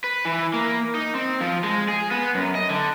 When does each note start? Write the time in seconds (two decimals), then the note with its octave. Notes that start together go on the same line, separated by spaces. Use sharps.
0.04 B4
0.25 E3
0.54 A#3
0.95 D#4
1.15 C4
1.41 F3
1.64 G#3
1.88 G#4
2.11 B3
2.35 F#2
2.55 D#5
2.70 D3